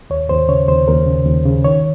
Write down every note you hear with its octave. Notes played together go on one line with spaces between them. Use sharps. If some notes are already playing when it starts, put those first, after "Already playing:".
D#2 C#5
D#2 C5
C#3 C#5
D#2 C5
D#2 A#4
C#3
D#2
C#3
D#3 C#5